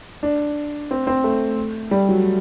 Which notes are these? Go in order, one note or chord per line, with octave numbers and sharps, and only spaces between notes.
D4
C4
C4
A3
G3
F#3